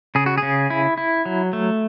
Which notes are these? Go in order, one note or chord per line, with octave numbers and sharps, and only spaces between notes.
C#3 G#4
F#4
C#3 G#4
E4
E4
F#3
A3